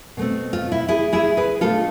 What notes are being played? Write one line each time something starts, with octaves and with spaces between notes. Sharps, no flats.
B2 A3 C4
F4
E4
E4 G#4
E4 G#4
G#4 B4
B2 A3 D4 F4 A4